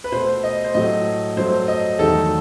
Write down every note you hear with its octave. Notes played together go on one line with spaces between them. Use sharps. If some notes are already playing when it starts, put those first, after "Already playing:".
B4
B2 A3 C5
D#5
C5
A2 F#3 A3 D#5
G2 F#3 A3 C5
D#5
E2 D#3 F#3 A3 A4